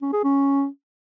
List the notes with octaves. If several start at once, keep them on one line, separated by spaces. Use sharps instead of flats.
C#4
G#4
C#4